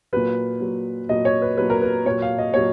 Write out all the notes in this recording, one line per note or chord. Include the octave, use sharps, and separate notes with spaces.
A#2 F#3 B4
A#2 F#3
A#2 F#3 D#5
C#5
B4
A#2 F#3 B4
A#4
B4
A#2 F#3 C#5
F5
D#5
A#2 F#3 C#5